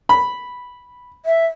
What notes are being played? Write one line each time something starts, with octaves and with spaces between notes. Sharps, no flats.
B5
E5